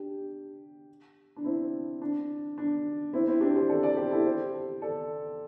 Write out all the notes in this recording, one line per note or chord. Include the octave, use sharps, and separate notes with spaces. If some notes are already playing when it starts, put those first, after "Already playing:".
Already playing: D4 G4
D4
C4 E4
D4
D4
C4 E4
C4 E4
D4 G4
G4 C5
A4 D5
A4 D5
G4 C5
E4 A4
G4 C5
A4 D5